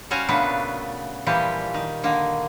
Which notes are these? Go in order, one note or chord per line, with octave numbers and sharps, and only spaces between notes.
G3 C#4 F#4 C5 F5 G#5
A#2 C#3 A3 B3 D4 B4
A#2 E3 F3 G3 G4
D#3
D3 D#3 A#3